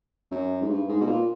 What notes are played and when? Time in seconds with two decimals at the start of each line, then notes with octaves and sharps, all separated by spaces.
0.31 F#2
0.62 G#2
0.70 G2
0.89 G#2
1.01 B2
1.07 A#2